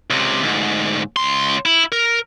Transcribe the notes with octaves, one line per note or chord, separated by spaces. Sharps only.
C#2 C3
D2 G#2
C#2 C6
E4
A#4